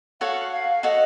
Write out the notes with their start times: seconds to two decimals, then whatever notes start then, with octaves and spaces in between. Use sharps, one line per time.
0.21 F#4 A4 C#5 F5 F#5
0.52 F5
0.83 F#4 A4 C#5 D#5 F#5